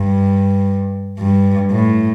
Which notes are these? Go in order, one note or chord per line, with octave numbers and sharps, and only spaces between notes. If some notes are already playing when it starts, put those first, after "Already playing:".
Already playing: G2
G2
A2